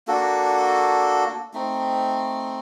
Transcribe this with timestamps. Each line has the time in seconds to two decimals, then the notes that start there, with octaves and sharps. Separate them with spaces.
0.07 A#3 D4 F#4 A4
1.54 A3 C4 D#4